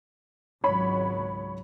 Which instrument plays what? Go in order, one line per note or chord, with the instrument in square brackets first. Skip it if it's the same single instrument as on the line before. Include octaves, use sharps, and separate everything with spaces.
[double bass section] G#1 C#2 F#3 [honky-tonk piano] C#5 B5